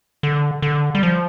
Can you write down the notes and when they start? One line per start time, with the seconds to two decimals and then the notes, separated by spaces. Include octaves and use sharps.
0.23 D3
0.62 D3
0.95 G3
1.03 F3